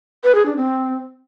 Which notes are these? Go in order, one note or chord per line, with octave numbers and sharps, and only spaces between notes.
B4
G#4
D4
C4